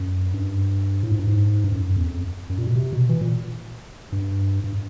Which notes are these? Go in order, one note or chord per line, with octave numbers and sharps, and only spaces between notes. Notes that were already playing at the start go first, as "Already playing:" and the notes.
Already playing: F#2
G2
A2
G#2
G2
G#2
G2
F#2
E2
F2
F#2
A#2
B2
C3
B2
E3
A#2
G2
G2